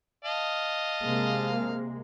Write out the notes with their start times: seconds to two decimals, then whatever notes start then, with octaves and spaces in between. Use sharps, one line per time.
0.25 D#5 F5 A5
1.05 C3 G#3 A#3